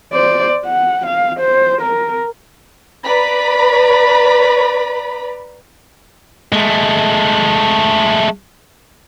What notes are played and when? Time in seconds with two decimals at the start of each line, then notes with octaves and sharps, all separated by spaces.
0.13 C5 D5
0.66 F#5
1.07 F5
1.40 C5
1.82 A#4
3.04 B4 D5 A#5 B5
6.53 G#3 A3